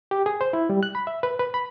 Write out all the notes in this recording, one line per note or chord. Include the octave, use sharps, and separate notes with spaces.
G4
G#4
C5
E4
G3
F#6
B5
E5
B4
B4
B5